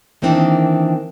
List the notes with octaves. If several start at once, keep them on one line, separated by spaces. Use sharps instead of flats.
D#3 E3 A#3 C4 D4 D#4